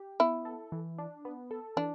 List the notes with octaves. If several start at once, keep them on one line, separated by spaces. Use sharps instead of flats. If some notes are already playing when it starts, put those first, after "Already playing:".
Already playing: G4
B3 E4
A4
E3
D4
B3
A4
E3 D4